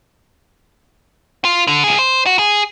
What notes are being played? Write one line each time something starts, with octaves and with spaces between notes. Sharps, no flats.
F4
D3
C#2 G#4
C5
F#4
G#4